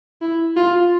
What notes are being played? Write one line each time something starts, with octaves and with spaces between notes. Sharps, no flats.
E4
F4